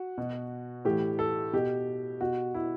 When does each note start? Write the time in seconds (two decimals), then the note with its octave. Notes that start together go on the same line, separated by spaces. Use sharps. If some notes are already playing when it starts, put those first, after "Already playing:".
Already playing: F#4
0.18 B2
0.85 A2 E3 G4
1.19 A4
1.53 B2 G4
2.21 B2 F#4
2.54 E4